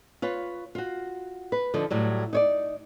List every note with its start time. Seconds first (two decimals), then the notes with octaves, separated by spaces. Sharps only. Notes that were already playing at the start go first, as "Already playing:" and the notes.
0.22 F4 B4 C#5
0.75 F4 F#4
1.52 B4
1.74 D3 F3 D#4
1.91 A2 F#3 G3
2.33 D#4 C#5 D5